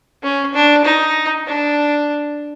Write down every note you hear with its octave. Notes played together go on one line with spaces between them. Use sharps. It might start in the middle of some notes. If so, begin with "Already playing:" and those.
C#4
D4
D#4
D4